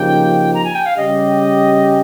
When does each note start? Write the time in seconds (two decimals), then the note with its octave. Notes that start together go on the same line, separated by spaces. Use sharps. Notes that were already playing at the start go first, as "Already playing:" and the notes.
Already playing: C#3 F3 A#3 D#4 G4 G5
0.54 A#5
0.64 G#5
0.75 G5
0.86 F5
0.97 C#3 G3 C#4 G4 D#5